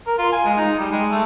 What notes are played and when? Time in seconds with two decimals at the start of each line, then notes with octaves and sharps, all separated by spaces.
0.07 A#4
0.18 F4
0.32 G#5
0.45 G#3
0.57 D#4
0.79 G3
0.91 G#3
1.10 A3